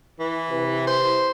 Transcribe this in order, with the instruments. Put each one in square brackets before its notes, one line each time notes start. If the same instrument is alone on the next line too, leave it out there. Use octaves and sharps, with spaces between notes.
[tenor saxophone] E3
[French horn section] C3 E4 B4
[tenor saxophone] C5